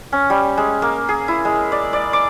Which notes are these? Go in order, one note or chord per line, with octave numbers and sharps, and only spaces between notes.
C#4
G3
G#3
A#3
G#4
E4
G#3
D5
D5
D6